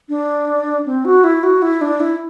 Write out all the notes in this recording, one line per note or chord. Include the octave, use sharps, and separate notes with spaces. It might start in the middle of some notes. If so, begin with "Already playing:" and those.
D4
C4
F#4
E4
F#4
E4
D4
E4